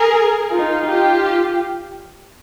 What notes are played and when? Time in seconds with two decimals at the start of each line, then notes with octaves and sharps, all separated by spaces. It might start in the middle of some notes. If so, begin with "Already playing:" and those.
Already playing: G#4 A#4
0.53 D#4 F4
0.86 F4 G4